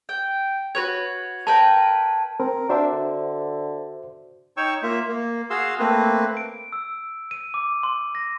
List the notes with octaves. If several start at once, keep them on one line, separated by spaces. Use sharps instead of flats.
G5
F#4 B4 C#5 G#6
A#4 B4 G5 A5
C4 A#4
D4 F#4 C5 E5
D3
D#4 C#5 G5 C#6 E6
A#3 F4 E5
A#3
F#4 G#4 F5 C6 E6
A3 A#3 C4 B4
D7
E6
D#7
D6
C6
A#6